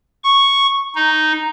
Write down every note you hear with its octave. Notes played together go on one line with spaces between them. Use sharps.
C#6
D#4